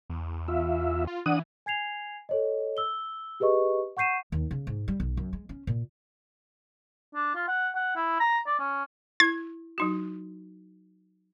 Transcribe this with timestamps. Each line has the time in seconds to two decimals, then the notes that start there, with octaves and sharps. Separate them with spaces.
0.10 E2
0.48 F4 E5
1.07 F4
1.26 E3 D4 F#5 D#6
1.66 G#5 G#6 C7 F7
2.29 A4 C#5 D#5
2.77 E6 G7
3.40 G4 G#4 B4 D#5 C#6
3.97 F#5 C#6 G6 C7 D#7 E7
4.32 D#2
4.51 C#3
4.67 G#2
4.88 G3
5.00 B1
5.17 F#2
5.33 G#3
5.49 C#4
5.67 A#2
7.15 D4
7.35 F4
7.48 F#5
7.75 F#5
7.96 E4
8.20 A#5
8.47 D5
8.59 C#4
9.20 E4 G#6
9.78 F#3 D#4 F#4